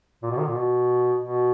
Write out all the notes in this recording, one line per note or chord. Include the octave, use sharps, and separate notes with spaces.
A#2
B2
D#3
A#2
B2
B2